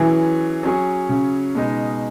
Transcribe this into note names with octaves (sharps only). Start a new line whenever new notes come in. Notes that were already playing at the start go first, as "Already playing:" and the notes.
Already playing: E3 F#3 C#4 G#4
F#3 C#4 G#4
C#3
B2 G#3 D#4